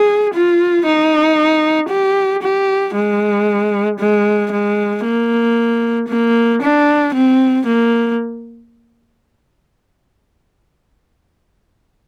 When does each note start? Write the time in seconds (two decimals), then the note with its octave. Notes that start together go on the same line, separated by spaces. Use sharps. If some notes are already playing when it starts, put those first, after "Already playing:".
Already playing: G#4
0.33 F4
0.85 D#4
1.89 G4
2.42 G4
2.95 G#3
3.99 G#3
4.51 G#3
5.04 A#3
6.08 A#3
6.62 D4
7.14 C4
7.66 A#3